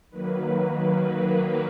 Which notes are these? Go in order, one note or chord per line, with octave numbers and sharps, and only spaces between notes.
D#3 F#3 A#3 B4